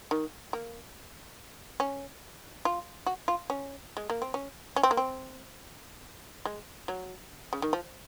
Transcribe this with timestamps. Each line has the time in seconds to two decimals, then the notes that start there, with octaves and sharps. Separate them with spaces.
0.11 D#3
0.53 A#3
1.80 C#4
2.65 F4
3.06 F#4
3.28 F4
3.50 C#4
3.97 G#3
4.10 A#3
4.22 C4
4.34 C#4
4.76 C#4
4.83 C4
4.91 A#3
4.97 C4
6.45 G#3
6.88 F#3
7.53 C#3
7.62 D#3
7.73 F3